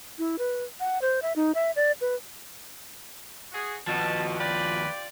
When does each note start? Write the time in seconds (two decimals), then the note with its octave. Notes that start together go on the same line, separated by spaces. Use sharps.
0.19 E4
0.39 B4
0.80 F#5
1.02 C5
1.22 E5
1.36 D#4
1.55 E5
1.76 D5
2.01 B4
3.52 F#4 G#4
3.87 D#2 B2 F3 A5
4.39 F4 G4 B4 D5